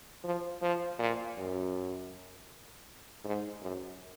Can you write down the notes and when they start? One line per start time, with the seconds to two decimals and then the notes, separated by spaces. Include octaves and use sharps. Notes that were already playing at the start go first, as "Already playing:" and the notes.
0.25 F3
0.62 F3
0.99 A#2
1.38 F#2
3.25 G#2
3.63 F#2